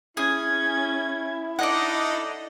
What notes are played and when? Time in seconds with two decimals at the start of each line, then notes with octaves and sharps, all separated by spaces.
0.17 C#4 E4 G#4 G#6
1.59 D4 D#4 A4 D5 D#5 F#5